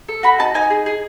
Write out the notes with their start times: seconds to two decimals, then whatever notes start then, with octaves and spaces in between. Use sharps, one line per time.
0.08 A4
0.23 F#4 B5
0.39 D#4 A5
0.54 D#4 G#5
0.70 G#4
0.86 G#4